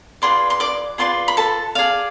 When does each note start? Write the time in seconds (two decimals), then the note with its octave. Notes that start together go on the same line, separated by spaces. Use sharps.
0.22 F4 G#4 B4 D5 C6
0.50 C6
0.60 D5 D6
0.98 F4 G#4 B4 D5 C6
1.28 B5
1.37 A4 A5
1.75 G#4 D5 F5